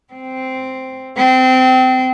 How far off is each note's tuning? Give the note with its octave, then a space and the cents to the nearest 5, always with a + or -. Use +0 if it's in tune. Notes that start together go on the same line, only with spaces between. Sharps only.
C4 -5
C4 -25